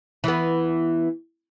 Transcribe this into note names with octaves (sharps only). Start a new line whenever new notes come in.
E3 B3